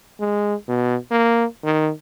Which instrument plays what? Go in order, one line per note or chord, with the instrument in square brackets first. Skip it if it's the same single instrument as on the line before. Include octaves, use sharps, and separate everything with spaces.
[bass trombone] G#3
B2
A#3
D#3